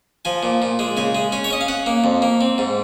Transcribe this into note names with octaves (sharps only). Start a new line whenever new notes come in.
F3 G#5
A#2
A#2
G#3
C#3 G#5
G#3
C#4 G#5
C#5
C#4 D#5
F5
C#4 F#5
A#3
F2
A#3
C4
G#2